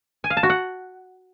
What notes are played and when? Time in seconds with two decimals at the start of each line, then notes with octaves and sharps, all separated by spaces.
0.24 G#5
0.30 F5
0.37 A5
0.43 F#4
0.50 F#5